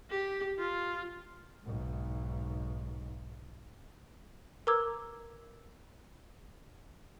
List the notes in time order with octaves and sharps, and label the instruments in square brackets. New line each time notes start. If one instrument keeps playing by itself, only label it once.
[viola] G4
F4
[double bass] B1 G#2
[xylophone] A#4 B4 A#5 D6 E6 G#6